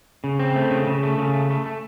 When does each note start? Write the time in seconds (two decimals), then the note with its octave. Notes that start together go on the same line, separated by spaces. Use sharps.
0.24 C#3
0.39 C4
0.55 A3
0.71 C#3
0.87 C#3
1.03 A3
1.18 C#3
1.33 A3
1.50 A3
1.66 A3